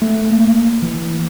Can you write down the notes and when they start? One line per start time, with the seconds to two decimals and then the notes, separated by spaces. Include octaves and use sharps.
0.02 A3
0.31 A#3
0.82 E3